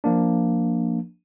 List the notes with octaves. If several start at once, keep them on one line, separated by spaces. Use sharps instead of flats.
F3 A#3 D4